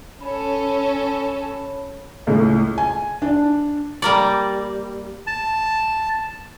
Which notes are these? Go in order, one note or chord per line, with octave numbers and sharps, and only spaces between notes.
C#4 A4 C#5 B5
C#2 A2
G#5
D4
G3 A#3 D5
A5